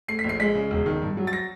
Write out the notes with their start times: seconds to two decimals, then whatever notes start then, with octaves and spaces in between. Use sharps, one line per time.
0.08 A3 C7
0.19 B6
0.24 A#1
0.29 C7
0.40 G#3 B6
0.55 C#3
0.71 E1
0.86 D#3
1.02 G2
1.17 F#3
1.27 A6
1.33 A#6